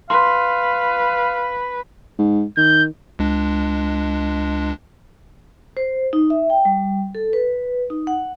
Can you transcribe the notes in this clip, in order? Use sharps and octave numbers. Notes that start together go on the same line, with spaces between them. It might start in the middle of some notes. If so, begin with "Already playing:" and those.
B4 F5 C6
G#2
D#3 G6
C#2 G#3 D4
C5
D#4
E5
G5
G3
A4
B4
D#4
F#5